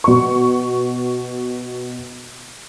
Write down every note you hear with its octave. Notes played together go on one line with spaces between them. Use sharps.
B2 C#6